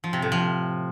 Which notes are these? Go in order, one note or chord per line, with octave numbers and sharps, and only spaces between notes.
F3
C3
A2
F3